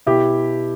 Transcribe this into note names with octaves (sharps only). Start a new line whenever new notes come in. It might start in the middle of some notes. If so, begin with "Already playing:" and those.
B2 E4 G4